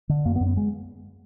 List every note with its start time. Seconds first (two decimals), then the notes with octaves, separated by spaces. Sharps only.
0.09 D3
0.25 F#2 A#3
0.36 B3
0.41 F#2
0.46 B3
0.57 G#3